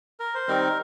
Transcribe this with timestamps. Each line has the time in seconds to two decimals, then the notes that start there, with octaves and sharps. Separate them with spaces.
0.20 A#4
0.35 C5
0.48 D#3 G3 C4 D#4 A#4